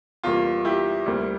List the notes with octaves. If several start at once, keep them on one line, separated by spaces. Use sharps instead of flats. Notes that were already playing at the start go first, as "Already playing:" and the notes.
E2 C3 G3 A#3 F4
E4 G4
D2 C3 G3 A#3